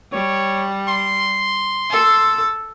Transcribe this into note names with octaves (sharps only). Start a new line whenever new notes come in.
G3 C#5
C6
A4